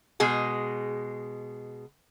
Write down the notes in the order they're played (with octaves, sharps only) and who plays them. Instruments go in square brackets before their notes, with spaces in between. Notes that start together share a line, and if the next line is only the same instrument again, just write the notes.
[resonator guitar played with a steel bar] B2 G#3 G#4